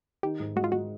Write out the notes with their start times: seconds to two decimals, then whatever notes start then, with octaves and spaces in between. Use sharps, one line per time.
0.23 D#3 G4
0.40 G#2
0.56 G#3 F#4
0.64 F4
0.72 G#3 F#4